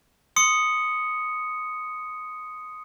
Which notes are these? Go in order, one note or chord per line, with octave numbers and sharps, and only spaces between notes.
C6 D#6 C#7